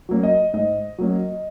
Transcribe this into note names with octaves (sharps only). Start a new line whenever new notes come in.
F#3 A#3 C#4
D#5
G#2 D#5
F#3 A#3 C#4